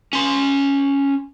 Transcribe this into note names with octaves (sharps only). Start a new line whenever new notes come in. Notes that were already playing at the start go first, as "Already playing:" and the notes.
C#4 C6